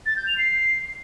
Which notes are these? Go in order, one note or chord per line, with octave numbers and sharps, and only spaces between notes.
A6
G6
F7
C7